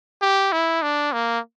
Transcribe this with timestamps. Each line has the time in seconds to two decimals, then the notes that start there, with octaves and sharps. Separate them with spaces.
0.22 G4
0.52 E4
0.82 D4
1.13 A#3